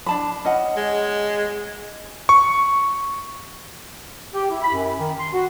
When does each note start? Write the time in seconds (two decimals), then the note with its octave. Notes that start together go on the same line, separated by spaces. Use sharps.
0.06 D4 A5 B5
0.45 C#4 D#5 F#5
0.77 G#3
2.29 C#6
4.34 G4
4.50 E4
4.62 B5
4.74 F#2
4.98 D#3
5.19 C6
5.33 F#4